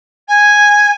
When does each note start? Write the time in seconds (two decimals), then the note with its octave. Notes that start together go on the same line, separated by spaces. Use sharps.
0.28 G#5